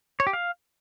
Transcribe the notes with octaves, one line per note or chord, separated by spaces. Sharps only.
C#5
G4
F5